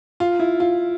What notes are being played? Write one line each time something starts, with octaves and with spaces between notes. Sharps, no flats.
F4
E4
F4